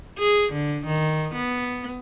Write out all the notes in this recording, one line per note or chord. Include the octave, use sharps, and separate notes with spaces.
G#4
D3
D#3
B3